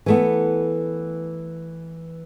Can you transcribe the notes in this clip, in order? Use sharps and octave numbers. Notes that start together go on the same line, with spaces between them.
E3 A3 B3